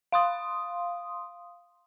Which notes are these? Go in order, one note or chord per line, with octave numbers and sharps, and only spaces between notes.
F5 C6 D#6